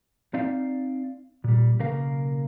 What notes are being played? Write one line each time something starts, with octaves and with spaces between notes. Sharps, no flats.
C4 D#4 D5 F5
A#2 G3
B1 C#3 A#3 A#4 F5